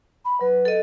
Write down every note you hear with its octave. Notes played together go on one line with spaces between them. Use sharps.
B5
F#3 B4
A4 D#5